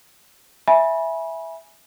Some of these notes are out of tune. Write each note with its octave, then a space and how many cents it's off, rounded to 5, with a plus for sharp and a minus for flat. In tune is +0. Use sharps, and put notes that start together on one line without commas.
E5 +0 G#5 +0 B5 -25